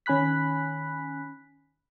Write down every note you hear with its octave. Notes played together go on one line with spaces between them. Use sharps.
D#3 C#4 G#5 B5 F#6 B6